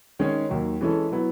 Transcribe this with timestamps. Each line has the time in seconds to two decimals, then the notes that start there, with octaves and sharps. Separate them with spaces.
0.19 D#3 G#3 C#4 G#4 C#5
0.49 D#2 D#3 F#3
0.81 E3 G#3 C#4 E4 A4
1.12 F#3 B3 E4